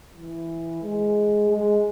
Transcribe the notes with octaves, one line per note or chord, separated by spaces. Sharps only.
E3
G#3
G#3